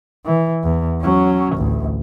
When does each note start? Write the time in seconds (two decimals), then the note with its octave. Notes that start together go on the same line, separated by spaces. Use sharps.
0.25 E3
0.64 E2
1.01 F#3 C#4
1.56 A1 D2